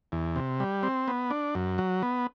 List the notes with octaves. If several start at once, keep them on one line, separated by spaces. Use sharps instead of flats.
E2
C3
G3
C4
B3
D4
F#2
F#3
B3